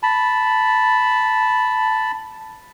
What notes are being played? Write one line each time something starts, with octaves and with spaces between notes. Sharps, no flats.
A5 B5